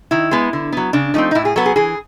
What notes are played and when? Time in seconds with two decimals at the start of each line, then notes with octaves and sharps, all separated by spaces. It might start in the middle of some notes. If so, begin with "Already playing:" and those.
0.11 D#3 E4
0.31 G#3 B3
0.53 D3
0.72 F#3 B3
0.93 C#3 D4
1.14 F3 A3 C4 D#4
1.31 D#4
1.35 A2 E4
1.45 G#4
1.56 F#3 B3 A4
1.66 G#4
1.76 E3 G#4